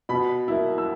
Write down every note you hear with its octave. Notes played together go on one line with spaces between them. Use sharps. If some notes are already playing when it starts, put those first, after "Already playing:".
B2 B5
A#3 E4
E6